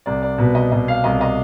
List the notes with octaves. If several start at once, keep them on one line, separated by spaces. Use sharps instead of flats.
C2 D5
D5
B2 B4
D#5
B2 D#5
F5
C2 D#5
D#5